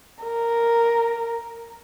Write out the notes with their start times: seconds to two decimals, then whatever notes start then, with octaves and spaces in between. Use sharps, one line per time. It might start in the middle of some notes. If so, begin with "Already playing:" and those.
0.23 A#4